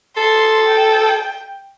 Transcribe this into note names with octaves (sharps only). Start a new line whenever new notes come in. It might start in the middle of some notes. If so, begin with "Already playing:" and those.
A4 C6
G5